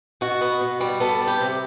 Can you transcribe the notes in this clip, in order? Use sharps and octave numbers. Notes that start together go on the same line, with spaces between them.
B2 F#4
B3
B2
G3
B3 A4
G3
G4
C3